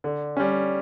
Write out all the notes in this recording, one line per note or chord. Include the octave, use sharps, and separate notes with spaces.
D3
G3 C#4